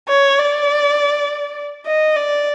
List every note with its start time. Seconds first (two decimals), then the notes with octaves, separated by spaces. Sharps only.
0.09 C#5
0.38 D5
1.86 D#5
2.16 D5